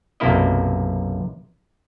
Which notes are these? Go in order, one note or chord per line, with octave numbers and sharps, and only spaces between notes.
B1 F#2 C3 A#3 E4 D#5